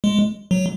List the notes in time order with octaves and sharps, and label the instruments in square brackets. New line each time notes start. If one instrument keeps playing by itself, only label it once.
[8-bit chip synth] G#3
F#3